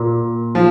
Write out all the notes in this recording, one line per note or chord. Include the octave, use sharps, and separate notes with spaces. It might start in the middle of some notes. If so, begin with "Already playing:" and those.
Already playing: A#2
F3